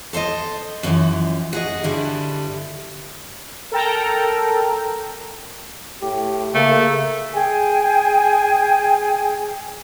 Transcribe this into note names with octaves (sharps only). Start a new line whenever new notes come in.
A4 C5 C#5 D#5
F#2 B2 D3 E3 F3
F#4 G#4 D#5
G2 D3 G3 E4
A4 A#4 G5 A#5
A2 G4
C#3 A3 A#3
G#4 G5 G#5